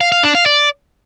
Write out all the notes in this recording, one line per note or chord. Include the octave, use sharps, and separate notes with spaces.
F5
F5
D4
F5
D5